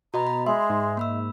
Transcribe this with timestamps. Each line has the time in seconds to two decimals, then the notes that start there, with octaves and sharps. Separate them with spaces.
0.14 B2 F#4 D#5 A#5 B5
0.27 B5
0.46 G#3 D#5 E5 C6
0.69 G#2
0.97 A#3 B5 E6